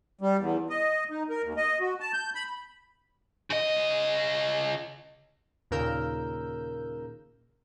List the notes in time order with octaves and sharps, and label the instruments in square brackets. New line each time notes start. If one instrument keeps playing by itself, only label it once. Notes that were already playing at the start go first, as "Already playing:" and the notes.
[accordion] G3
E2
D#5
D#4
A#4
D#2
D#5
F#4
A5
G6
B5
[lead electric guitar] C#3 D#5
[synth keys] D#2 A#2 C#3 A#4 E6 G6